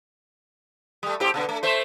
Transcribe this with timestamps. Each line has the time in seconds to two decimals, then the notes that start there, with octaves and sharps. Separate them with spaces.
1.03 G3 A3
1.20 G#2 C4 G4
1.34 B2 D3 B3
1.49 A3
1.63 A3 C5 E5